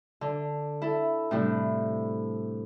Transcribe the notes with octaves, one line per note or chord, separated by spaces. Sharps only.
D3
E4 A4
A2 C3 G3 D4 E4